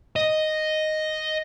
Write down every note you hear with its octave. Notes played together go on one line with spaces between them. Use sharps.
D#5